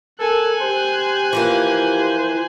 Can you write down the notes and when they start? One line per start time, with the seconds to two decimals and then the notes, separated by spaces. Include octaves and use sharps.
0.20 A4 A#4 G#5 F#6
0.61 G4 C5
1.33 E3 F3 A#3 C5